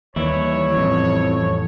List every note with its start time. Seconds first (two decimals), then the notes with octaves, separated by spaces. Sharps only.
0.16 D#2 E3 G3 E4 C#5
0.77 A1 F2